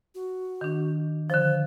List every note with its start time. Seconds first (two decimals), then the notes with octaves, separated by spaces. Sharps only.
0.15 F#4
0.61 D#3 D4
1.30 D3 F3 C5